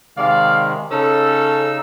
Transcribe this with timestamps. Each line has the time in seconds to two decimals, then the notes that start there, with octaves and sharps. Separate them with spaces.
0.17 C3 D#3 G#3 D5 F5
0.91 C#3 C#4 D#4 A4 E6